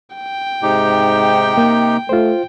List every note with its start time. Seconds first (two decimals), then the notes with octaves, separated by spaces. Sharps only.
0.16 G5
0.63 G#2 C3 D#4 G4
1.58 A#3
2.09 A3 F4 C5